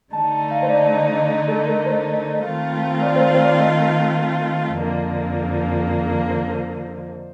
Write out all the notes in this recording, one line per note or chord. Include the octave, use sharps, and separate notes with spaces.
D3 A3 D#4 A5
A5
F5
C5
D5
D#5
D#5
A4
A#4
C5
D#3 A3 C4 F4 A#4
D5
C5
C5
D5
D#5
F2 D3 F3 A#3
C5
C5